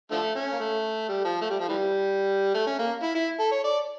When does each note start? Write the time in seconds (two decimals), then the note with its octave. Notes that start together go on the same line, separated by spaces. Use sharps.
0.11 D3 F3 A3
0.35 C#4
0.52 A#3
0.59 A3
1.08 G3
1.25 F3
1.41 A3
1.50 G3
1.59 F3
1.68 E3 G3
2.54 A3
2.66 C#4
2.79 A#3
3.03 E4
3.15 E4
3.40 A4
3.51 C#5
3.64 D5